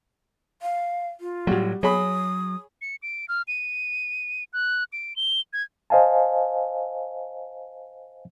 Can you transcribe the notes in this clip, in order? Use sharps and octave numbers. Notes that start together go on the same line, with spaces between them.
F5
F4
A2 F#3 G3 F#4
F#3 G#4 C#5 B5 D#6
C#7
D7
F6
D#7
F#6
D7
G7
G#6
C5 D#5 F5 G#5 A5